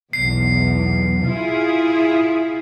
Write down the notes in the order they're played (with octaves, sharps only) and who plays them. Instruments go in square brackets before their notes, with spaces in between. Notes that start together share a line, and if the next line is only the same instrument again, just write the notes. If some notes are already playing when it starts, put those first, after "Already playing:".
[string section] B1 E2 [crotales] C7
[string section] E4 F4 G#4